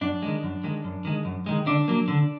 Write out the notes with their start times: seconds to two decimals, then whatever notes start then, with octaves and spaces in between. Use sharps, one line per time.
0.01 F#2 D4
0.22 D#3 G#3
0.43 F#2
0.64 D#3 G#3
0.84 F#2
1.05 D#3 G#3
1.25 F#2
1.46 D#3 G#3
1.66 D3 D4
1.88 F#3 A#3
2.08 D3